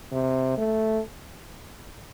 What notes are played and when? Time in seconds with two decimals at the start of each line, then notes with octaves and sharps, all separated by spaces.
0.12 C3
0.58 A3